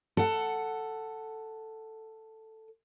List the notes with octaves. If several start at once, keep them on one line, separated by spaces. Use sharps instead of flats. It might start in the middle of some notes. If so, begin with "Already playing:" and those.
A4 F#5